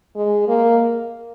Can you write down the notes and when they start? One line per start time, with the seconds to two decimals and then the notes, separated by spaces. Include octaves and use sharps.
0.16 G#3
0.48 A#3